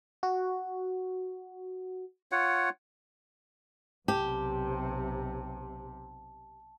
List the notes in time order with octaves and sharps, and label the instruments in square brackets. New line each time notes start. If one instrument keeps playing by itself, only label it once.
[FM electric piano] F#4
[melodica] F4 C#5 F#5
[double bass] B1 C3 [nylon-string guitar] G4 [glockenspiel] A5